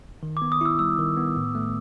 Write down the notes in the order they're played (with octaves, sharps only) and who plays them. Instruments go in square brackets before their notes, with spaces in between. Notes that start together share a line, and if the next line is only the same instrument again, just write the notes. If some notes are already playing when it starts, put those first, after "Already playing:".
[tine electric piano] D#3
[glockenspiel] D6
[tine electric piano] B3
[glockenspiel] D#6
[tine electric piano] E4 [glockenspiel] E6
[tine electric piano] G3 [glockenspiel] E6
[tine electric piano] D#3
B3
A2
A3